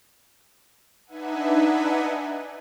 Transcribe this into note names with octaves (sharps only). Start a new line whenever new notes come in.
D4 D#4 B4 E5 F#5 G#5